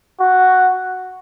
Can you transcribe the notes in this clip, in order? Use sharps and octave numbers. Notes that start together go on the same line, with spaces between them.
F#4